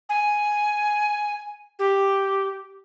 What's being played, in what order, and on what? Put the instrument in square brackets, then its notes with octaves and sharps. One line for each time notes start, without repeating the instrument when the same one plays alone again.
[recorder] G#5
G4